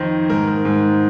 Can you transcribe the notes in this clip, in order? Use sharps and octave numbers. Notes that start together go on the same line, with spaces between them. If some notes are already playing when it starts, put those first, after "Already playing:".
Already playing: F2 D#3 C5
G#2 A#4
G#2